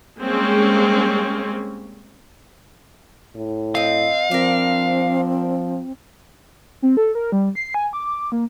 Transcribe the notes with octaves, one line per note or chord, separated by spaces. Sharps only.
G3 G#3 A#3 C4 C#4 G#4
A2
C4 D#5 F5
F3 C4 D4 A#4
C4
A4
A#4
G3
C7
G#5
D6
D6
A#3